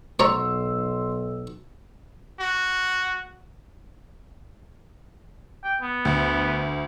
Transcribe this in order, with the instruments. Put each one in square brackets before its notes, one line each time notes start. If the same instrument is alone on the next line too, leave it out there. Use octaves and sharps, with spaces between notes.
[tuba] B1 [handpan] F#4 [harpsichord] C#5 D5 A#5 [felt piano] C6 E6
[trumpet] F#4
[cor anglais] G5
B3
[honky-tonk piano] D2